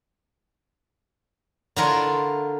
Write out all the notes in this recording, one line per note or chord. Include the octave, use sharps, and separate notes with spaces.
D3 E4 F4 A#4 C#5